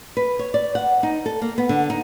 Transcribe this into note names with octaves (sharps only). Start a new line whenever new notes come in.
B4
C#5
D5
F#5
D#4
A4
A#3
B3
D3
D#4